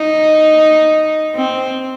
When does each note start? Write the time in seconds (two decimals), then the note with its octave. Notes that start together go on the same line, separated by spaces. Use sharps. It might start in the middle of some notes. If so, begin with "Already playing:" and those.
Already playing: D#4
1.35 C4